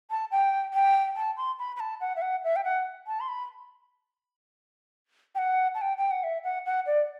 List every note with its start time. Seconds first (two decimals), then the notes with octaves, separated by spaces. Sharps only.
0.10 A5
0.31 G5
0.74 G5
1.16 A5
1.37 C6
1.59 B5
1.76 B5
1.80 A5
2.01 F#5
2.16 E5
2.22 F#5
2.44 E5
2.56 G5
2.64 F#5
3.07 A5
3.20 C6
3.28 B5
5.35 G5
5.38 F#5
5.75 A5
5.81 G5
5.98 G5
6.11 F#5
6.24 E5
6.44 F#5
6.65 F#5
6.86 D5